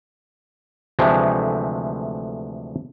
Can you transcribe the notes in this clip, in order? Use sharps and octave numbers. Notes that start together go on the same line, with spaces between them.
D2 C3 E3 F3 G#3 A3